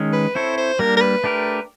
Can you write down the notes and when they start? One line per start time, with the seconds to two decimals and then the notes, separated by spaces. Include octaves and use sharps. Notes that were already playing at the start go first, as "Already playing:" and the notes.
Already playing: D#3 G#3 C#4
0.13 B4
0.35 C4 E4 A4 C5 C#5
0.57 C5
0.79 G3 A#3 D4 A#4
0.97 A#4
1.01 B4
1.24 A3 D4 G4 A#4